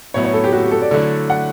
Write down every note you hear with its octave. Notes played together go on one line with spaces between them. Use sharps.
A2 F#3 B3 E4 C#5
C#5
A4
G4
F#4
G4
A4
D5
D3 F#3 A3 E4
F#5